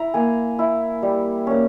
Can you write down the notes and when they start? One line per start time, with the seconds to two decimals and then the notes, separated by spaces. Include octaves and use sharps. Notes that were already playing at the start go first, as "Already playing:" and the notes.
Already playing: E4 A#5
0.14 A#3 G#5
0.59 E4
1.02 G3
1.47 A#3 C#4